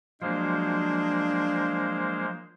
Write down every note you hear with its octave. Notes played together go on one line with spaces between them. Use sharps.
F3 F#3 G#3 A#3 D4 C5